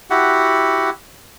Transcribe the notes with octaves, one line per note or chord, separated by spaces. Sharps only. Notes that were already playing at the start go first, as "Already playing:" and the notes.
E4 F#4 G4 F#5